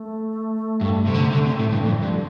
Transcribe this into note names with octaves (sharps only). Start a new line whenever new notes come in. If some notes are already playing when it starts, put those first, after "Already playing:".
Already playing: A3
G2
C3
D3
C3
D3
C3
A2
G2
F2 D3
G2